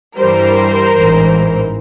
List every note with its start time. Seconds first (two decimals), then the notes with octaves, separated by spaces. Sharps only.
0.17 G2 E3 G3 A#4 C5
0.95 A1 G#2 E3